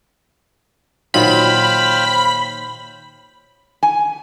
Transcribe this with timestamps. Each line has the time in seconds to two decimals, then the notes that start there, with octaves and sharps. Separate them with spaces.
1.14 A#2 D#3 F#3 C5 F5 G5 B5
3.83 G#5